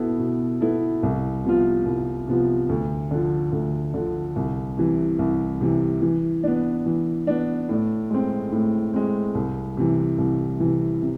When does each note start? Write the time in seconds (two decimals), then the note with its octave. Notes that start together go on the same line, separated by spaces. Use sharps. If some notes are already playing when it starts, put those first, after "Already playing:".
Already playing: B2 B3 E4 A4
0.19 B2
0.61 B3 E4 A4
1.03 C2
1.44 C3 F3 B3 F4
1.86 C2
2.27 C3 F3 B3 F4
2.69 D2
3.11 D3 F3
3.52 D2
3.94 D3 F3
4.36 C2
4.77 C3 E3
5.19 C2
5.61 C3 E3
6.02 E3
6.44 B3 D4
6.86 E3
7.27 B3 D4
7.69 A2
8.10 G#3 C4
8.52 A2
8.93 G#3 C4
9.35 C2
9.77 C3 E3
10.18 C2
10.60 C3 E3
11.02 C3